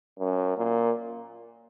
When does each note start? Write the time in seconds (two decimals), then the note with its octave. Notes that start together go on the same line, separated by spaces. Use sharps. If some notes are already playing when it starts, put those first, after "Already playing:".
0.19 F#2
0.57 A#2